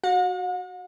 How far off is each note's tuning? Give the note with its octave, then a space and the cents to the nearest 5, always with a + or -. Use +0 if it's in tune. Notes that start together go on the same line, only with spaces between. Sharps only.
F#4 +0 F#5 -45